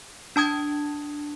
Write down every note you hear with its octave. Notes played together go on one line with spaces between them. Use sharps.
D4 A5 D#6 G#6